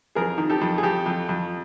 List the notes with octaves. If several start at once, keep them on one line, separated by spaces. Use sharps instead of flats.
F2 G#4 A#4
D#3
G4 A4
F2
G#4
F2 G4 A4
F2
F2